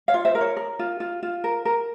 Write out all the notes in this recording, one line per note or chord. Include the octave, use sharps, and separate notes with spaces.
C#5 F5
F4
C5 E5
A#4
C#5
A#4
F4
F4
F4
A#4
A#4